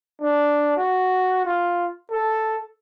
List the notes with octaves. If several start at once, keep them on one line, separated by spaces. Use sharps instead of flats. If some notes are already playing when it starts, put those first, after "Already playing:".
D4
F#4
F4
A4